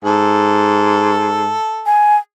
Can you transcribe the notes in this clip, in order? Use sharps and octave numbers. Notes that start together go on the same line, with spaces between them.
G#2 A4
G#5